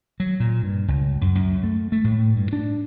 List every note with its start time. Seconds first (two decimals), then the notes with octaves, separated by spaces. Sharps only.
0.20 F#3
0.40 A#2
0.63 G2
0.88 C#2
1.21 F#2
1.35 F#2
1.63 A3
1.92 A3
2.04 A2
2.36 G2
2.53 D4